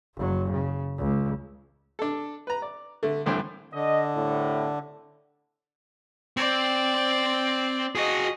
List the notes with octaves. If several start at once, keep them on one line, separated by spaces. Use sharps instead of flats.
F#1 F#3
C#3
C#2
D4 A4
B4 A#5
D5
D3 A3
C2 A2 E3 D4 C5 G5
D3 D#5
C2 A2
C4 D5
F#4 G#4 D#5